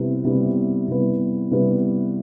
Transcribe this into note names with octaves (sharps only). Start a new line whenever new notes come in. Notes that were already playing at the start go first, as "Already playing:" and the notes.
Already playing: C3 G3 B3 E4 B4
C3 G3 B3 E4 B4
C3 G3 B3 E4 B4
C3 G3 B3 E4 B4